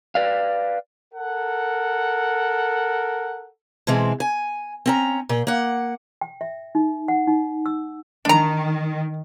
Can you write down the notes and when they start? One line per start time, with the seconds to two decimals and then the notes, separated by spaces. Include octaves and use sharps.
0.15 B4 D5 F5
1.14 A4 A#4 F#5
3.87 B2 E3 G#3 C4
4.20 G#5
4.86 C4 C#4 A#5
5.29 A#2
5.47 A#3 F#5
6.21 G5
6.41 E5
6.75 D#4
7.08 F#5
7.27 D#4
7.66 E6
8.25 D#3 D4 A#5